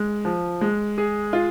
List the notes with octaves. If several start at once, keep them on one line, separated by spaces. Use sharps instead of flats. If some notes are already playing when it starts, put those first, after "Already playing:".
Already playing: G#3
F3
G#3
G#4
F4